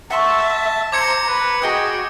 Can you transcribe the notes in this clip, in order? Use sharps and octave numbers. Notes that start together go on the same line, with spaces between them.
E5 F#5 A5 C6 C#6
C5 A#5 D6 G#6 C#7
B4
F#4 G#4 D#5 G5 D#6